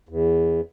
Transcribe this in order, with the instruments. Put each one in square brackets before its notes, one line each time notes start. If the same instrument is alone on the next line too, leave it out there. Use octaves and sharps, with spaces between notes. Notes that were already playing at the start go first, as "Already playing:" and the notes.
[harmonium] E2